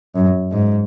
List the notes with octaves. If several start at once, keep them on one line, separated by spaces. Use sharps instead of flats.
F#2
G#2